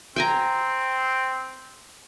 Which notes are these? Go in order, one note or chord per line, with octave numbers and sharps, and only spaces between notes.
C4 G5 G#5 A#5